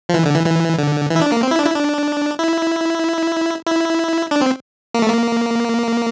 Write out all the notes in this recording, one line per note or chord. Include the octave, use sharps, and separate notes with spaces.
F3
E3
D3
E3
E3
D3
E3
E4
D4
A#3
C4
E4
D4
E4
D4
E4
E4
D4
C4
A#3
A3
A#3